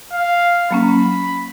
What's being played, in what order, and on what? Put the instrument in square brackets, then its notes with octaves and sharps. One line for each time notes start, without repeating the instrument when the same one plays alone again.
[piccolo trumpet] F5
[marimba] F#3 A#3 C#4 [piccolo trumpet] B5